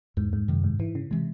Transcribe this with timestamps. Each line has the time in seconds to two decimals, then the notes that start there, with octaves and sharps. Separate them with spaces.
0.17 E2 G#2
0.33 G#2
0.48 F#2 C3 D#3
0.64 G#2
0.79 G#2 E3
0.95 C#3
1.11 C3 E3 G#3